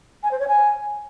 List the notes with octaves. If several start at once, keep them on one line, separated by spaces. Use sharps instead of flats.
G#5
C5
C#5
G#5